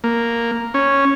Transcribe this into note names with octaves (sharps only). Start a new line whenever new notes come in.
A#3
C#4